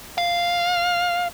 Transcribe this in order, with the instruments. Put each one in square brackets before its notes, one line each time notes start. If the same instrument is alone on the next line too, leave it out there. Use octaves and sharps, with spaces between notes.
[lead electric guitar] F5